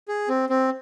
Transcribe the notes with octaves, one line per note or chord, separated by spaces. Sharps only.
G#4
C4
C4